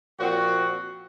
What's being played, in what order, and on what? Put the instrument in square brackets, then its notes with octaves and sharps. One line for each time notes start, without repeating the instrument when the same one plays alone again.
[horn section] A#2 F3 C4 F#4